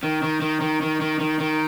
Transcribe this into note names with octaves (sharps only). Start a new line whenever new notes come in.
D#3
D#3
D#3
D#3
D#3
D#3
D#3
D#3